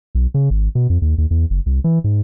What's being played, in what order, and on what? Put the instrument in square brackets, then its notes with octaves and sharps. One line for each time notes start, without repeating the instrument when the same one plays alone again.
[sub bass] B1
C#3
G#1
B2
F2
D#2
D#2
E2
F#1
C2
E3
G#2